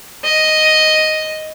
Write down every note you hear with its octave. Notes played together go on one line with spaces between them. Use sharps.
D#5